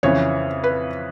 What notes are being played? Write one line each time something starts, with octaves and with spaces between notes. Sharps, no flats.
F2 C#3 E3 C#5
B4